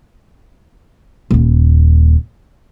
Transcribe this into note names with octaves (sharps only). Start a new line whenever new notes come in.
D#1 D#2